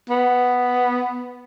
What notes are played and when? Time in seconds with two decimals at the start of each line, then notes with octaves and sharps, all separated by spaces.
0.10 B3